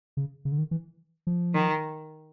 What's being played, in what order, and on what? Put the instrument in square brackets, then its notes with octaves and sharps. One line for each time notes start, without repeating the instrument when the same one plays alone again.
[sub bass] C#3
C#3
D3
D#3
E3
F3
[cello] D#3